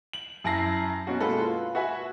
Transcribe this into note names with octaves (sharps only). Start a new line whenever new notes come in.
F#7
F#2 E4 A5 A#6 C7
B2 C#4 F#4
G#3 A#3 A4 B4
F4
F#4 B4 E5 F#5 G#5